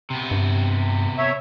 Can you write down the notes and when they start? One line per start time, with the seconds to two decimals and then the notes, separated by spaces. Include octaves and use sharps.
0.10 C3 B3
0.31 G2
1.18 C#5 E5